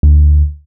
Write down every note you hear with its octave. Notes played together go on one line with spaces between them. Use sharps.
D2